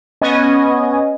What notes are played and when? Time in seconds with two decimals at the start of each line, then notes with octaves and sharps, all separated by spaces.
0.21 B3 C#4 D#5 G#5